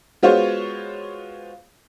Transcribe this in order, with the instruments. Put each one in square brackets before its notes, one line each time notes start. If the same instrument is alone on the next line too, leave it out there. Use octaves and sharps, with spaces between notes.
[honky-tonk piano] G#3 B3 F4 F#4 C5 C#5